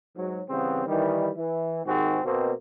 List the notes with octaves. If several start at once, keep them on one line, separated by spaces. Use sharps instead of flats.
G#2 F#3
C#3 E3 G3 B3 C4
D#3 E3 G3
E3
D#2 G#2 D#3 C4 F#4 G#4
B2 A#3 C4